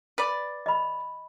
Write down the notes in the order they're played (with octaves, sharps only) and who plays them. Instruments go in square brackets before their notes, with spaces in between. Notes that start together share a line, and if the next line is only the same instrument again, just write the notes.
[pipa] B4 D5
[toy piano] D#5 B5